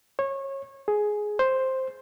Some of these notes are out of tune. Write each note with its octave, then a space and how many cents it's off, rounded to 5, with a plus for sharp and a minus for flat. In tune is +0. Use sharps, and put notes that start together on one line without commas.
C#5 -25
G#4 +10
C5 +5